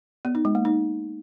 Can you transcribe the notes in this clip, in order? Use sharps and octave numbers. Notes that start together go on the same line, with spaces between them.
B3
D#4
G#3
A#3
D#4